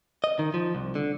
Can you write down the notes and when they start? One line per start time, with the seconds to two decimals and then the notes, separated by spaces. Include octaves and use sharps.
0.24 D#5
0.39 D#3
0.54 F3
0.75 C2
0.95 D3